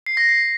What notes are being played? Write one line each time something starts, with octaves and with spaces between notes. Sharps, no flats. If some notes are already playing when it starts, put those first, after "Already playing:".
C7
A#6
C7